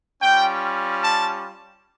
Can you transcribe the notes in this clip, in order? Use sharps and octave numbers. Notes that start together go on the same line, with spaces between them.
G3 C#4 F4 G5
A5